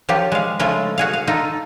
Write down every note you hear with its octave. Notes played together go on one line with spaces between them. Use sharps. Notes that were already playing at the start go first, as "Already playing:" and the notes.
F3 F#3 F4 G4
G#3 F5
C#3 F3 G#3 A3 F4
F#4 G#4 F5
F5
D#4 F4 A4